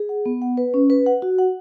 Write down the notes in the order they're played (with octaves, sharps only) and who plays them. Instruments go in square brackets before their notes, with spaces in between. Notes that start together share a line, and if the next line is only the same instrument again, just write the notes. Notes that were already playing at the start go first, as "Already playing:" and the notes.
Already playing: [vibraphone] G#4
F#5
B3
F#5
B4
C#4
B4
F#5
F#4
F#5